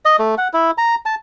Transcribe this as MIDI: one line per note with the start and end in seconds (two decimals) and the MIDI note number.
0.05 0.16 75
0.19 0.35 57
0.38 0.48 78
0.53 0.71 64
0.78 0.95 82
1.06 1.15 81